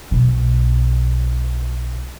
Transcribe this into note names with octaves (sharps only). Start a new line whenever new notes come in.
B1 B2